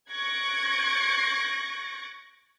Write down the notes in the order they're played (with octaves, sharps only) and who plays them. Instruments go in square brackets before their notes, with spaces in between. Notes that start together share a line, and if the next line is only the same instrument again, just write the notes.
[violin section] C#6 F#6 G#6 A#6 C#7 D7